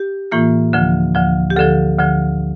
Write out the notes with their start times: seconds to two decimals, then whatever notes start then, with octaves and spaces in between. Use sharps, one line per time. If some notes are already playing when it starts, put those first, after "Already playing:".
Already playing: G4
0.32 A2 E3 A#3 F4
0.73 D2 D3 F3
1.15 D2 D3 F3
1.50 G4
1.56 D2 D3 F3 A4
1.99 D2 D3 F3